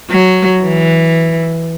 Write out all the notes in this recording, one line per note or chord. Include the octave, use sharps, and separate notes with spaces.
F#3
E3